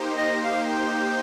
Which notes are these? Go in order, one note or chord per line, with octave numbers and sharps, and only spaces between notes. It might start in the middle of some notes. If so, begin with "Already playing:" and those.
Already playing: A#3 D#4 G4 C5
D#5
F5
G5